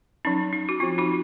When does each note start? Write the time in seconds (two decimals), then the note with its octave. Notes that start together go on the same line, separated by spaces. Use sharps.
0.25 F#3 C#4 D#4
0.53 D#4
0.69 F#4
0.80 F3 C4 F4
0.98 D#4 F#4